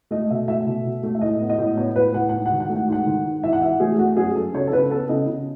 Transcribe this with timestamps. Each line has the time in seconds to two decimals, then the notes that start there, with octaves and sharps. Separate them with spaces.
0.11 A3 D#5
0.30 B2 E5
0.48 A3 E5
0.66 B2
0.85 B2
1.03 A3
1.15 E5
1.21 A2 D#5
1.41 B3
1.49 D#5
1.58 A2
1.77 B3 C#5
1.96 A2 B4
2.14 A2 F#5
2.29 F#5
2.33 G#2
2.46 F#5
2.51 D#3
2.60 F#5
2.69 A3
2.76 F#5
2.88 G#2 F#5
3.06 D#3
3.25 G#2
3.43 E3 E5
3.53 F#5
3.62 E3 E5
3.80 A3 G#4
3.98 A3 F#4
4.16 F#2 G#4
4.35 F#2 A4
4.54 C#3 C#5
4.67 A4
4.72 C#3 B4
4.91 B3 A4
5.09 C#3 D#5
5.27 C#3